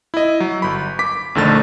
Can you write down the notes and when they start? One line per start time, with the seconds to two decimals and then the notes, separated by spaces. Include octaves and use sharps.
0.14 E4 D#5
0.40 F#3
0.62 G1 B5
0.99 D6 B6
1.35 A#1 F2 D3 D#3 A3 A6